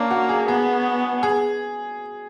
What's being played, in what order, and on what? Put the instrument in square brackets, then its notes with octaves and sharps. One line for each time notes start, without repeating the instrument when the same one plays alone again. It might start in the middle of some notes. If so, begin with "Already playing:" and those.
Already playing: [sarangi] A#3 [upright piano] C#4 D4
[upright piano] F#4
G#4
[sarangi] B3 [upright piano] G#4
[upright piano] G#4